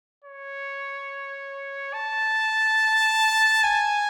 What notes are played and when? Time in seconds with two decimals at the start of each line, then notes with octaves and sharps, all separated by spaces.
0.24 C#5
1.94 A5
3.64 G#5